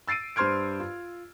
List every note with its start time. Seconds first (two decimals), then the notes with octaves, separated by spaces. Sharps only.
0.07 E6 A6 C7 D7 D#7
0.36 G2 C5 C6 F6 G#6 D7
0.80 F4